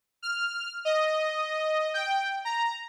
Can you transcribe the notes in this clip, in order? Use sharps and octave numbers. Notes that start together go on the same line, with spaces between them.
F6
D#5
G5
A#5